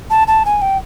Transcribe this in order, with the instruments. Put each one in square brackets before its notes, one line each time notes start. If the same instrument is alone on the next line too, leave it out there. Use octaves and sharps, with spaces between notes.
[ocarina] A5
A5
G#5
G5